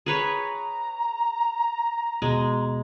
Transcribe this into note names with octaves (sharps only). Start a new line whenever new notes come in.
G#4 B4 C#5 A#5
D#2 B2 G#3